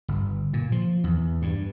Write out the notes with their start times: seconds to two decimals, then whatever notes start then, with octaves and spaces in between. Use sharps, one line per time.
0.08 G1
0.53 A#2
0.72 F3
1.04 E2
1.42 G2